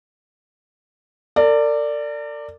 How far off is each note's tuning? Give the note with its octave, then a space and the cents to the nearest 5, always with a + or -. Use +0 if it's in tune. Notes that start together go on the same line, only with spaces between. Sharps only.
A#4 -45 D5 +0